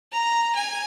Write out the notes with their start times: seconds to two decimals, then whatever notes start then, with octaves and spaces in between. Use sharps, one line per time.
0.12 A#5
0.55 G#5